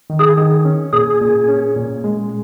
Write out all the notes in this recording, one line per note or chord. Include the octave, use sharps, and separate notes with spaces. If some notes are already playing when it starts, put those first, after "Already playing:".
D#3
G#4
D#3
C#4
A#2 G#4
A#2
C#4
A#2
G#3